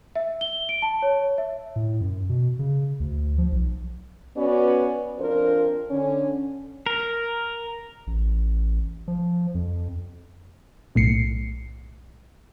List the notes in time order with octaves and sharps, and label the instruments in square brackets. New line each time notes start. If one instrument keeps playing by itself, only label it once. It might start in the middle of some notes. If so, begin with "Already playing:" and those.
[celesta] E5
G7
D7
A5
C#5
E5
[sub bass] A2
F#2
B2
C#3
D2
F3
B1
[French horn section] B3 C#4 F#4 B4 D5
F2 C4 D4 F4 A#4 C5
D3 C#4
[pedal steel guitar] A#4
[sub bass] A1
F3
F2
[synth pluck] B1 A2 C7 C#7